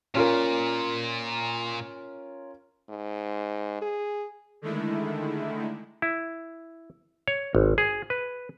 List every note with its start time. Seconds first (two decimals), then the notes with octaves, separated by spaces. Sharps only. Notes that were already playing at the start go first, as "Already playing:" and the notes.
0.15 A#2 C#4 F4 A#4
2.90 G#2
3.82 G#4
4.62 D3 D#3 G#3 A3 E4
6.02 E4
7.28 C#5
7.55 G#1
7.78 G#4
8.10 B4